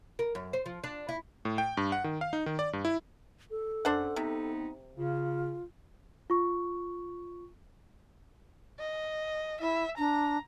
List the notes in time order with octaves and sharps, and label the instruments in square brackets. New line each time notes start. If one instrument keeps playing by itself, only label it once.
[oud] A#4
F#2
C5
F3
D4
E4
[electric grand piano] A2
G5
G2
F#5
D#3
F5
D#4
D#3
D5
G2
E4
[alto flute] A4
[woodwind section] F#2 [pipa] D4 C5 F#5
[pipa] C3 [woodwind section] B3 C4 D#4
[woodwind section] C#3 [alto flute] F4
[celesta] F4 C#6
[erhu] D#5
[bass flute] E4 [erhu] E5
[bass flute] D4 [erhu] A#5